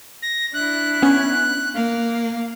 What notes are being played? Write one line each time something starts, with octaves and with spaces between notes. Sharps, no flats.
A#6
D4 E4 F#6
B3 C#4 G#6
A#3 F5